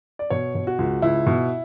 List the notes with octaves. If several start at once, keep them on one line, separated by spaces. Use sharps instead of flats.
D5
B2 C#5
B2
F#4
C#2
C#2 E4
B2